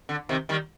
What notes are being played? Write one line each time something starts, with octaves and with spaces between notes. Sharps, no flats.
D3
C3 D#3
D#3 G3